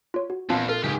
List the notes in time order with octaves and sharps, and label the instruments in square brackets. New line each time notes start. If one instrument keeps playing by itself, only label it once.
[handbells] F4 C#5
F#4
[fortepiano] A#1 F5 [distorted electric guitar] E2 [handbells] C4 F4 A5
[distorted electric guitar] F4 [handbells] A4 A#4
[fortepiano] C#2 G#2 [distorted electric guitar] G4 G#4